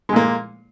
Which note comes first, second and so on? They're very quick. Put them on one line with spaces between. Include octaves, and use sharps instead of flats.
G#3 A#2 A#3